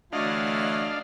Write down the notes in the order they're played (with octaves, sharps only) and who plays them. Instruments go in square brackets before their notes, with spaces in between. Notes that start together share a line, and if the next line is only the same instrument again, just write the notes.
[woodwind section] D3 E3 A3 [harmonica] F#3 E4 [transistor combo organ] D4 F5 [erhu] D#5